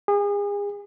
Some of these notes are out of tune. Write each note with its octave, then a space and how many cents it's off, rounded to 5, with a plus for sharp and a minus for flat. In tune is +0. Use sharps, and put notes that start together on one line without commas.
G#4 -35